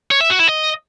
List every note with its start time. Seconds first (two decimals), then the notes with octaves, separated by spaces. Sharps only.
0.11 C#5
0.21 E5
0.30 F#4
0.39 E4
0.49 D#5